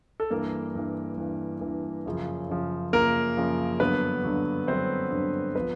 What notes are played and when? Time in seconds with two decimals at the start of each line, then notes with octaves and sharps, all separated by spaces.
0.20 A4
0.30 G2 E3 A#3 A#4
0.75 G2 E3
1.18 G2 E3
1.61 G2 E3
2.06 F#2 C#3 F3
2.49 F#2 C#3 F3
2.93 F#2 C#3 F3 A#3 A#4
3.37 F#2 C#3 F3
3.80 G2 D3 F#3 B3 B4
4.24 G2 D3 F#3
4.67 G2 D3 F#3 C4 C5
5.11 G2 D3 F#3
5.55 F3 B3 B4